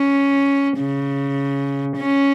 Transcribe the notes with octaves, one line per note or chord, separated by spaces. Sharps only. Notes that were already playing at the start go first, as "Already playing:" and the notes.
Already playing: C#4
C#3
C#4